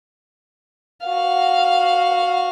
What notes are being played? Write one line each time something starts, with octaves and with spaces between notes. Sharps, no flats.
F#4 F5